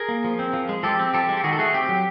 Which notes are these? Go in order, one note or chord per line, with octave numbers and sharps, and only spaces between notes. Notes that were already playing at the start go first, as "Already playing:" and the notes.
Already playing: G#4 A#4
A#3
F3
C4
F3
G#3
F3 G4 A4
C4
F3 G4 A4
G#3
G4
D#3 F#4 G#4
A4
A3 F#4 G#4
C4 G4
F#3